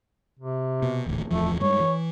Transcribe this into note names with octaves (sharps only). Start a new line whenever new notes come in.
C3
B2
D#1 A1 D2
D1 E2 F3 A3
G2 G3 G#3 C#5
E3